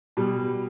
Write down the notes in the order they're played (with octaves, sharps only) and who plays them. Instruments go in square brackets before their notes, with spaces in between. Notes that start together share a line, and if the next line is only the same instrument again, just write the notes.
[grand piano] B2 G3